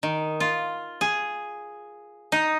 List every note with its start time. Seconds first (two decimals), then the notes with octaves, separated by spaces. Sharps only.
0.03 D#3
0.40 F4
1.01 G#4
2.32 D#4